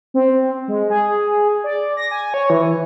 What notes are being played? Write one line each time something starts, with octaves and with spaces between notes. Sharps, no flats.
C4
G#3
G#4
D5
A#6
G#5
C#5
E3